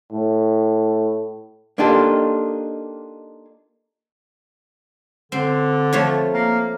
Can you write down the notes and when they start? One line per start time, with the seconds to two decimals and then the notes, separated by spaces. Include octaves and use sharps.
0.12 A2
1.78 A#3 D4 D#4 F4 G4 A4
5.32 D3 C4
5.93 F3 A3 C#5
6.33 A#3